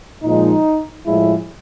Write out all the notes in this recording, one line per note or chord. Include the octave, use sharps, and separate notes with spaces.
A#2 F3 G#3 D#4
A2 F3 G#3 E4